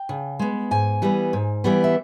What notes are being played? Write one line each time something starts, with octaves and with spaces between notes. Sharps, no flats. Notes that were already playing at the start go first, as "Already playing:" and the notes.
Already playing: G5
C#3
G#3 B3
G#2 G#5
E3 G3 B3
G#2
E3 G3 B3
E5